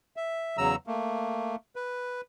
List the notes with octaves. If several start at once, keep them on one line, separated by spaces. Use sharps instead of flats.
E5
E2 C#3 F#3 A#5 E6
A3 A#3
B4